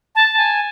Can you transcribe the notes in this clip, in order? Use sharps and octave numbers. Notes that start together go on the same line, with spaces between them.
A5
G#5